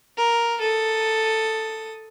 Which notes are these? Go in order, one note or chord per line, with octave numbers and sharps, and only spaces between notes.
A#4
A4 D#6